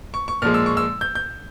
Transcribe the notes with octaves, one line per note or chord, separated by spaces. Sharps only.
C#6
C#6
A#2 F3 G#3 F6
E6
C#6
E6
G6
G6